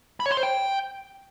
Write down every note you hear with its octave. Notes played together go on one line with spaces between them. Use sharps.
B5
C#5
C6
C5
G5